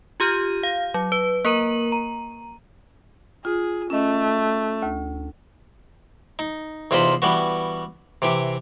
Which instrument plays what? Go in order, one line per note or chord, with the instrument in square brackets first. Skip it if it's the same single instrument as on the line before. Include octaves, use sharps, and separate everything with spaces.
[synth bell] F4 G4 F6 G6 D#7
F5
F#3
B4
A#3 A#4 A#5 D#7 F#7
A#5
[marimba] F4 [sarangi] G#4
[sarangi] A3 [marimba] C#4 D#5
[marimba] D2
[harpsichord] D#4
E2 C3 D#4 F4 C5 B5
E3 G3 B3 F#4
C3 E3 G4